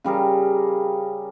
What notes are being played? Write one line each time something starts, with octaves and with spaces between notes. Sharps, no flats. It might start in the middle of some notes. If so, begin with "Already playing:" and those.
C#3 G3 G#4 A#4